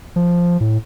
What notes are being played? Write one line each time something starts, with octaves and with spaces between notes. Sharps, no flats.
F3
A2